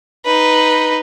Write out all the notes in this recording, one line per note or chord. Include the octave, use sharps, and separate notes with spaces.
D#4 B4